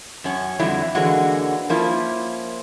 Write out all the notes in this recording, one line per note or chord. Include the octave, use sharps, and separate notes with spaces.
F#2 C#4
F2 D3 F#3 G3 E4 E5
D3 E3 G#3 A#3 C#4 F#4
F3 A#3 C#4 E4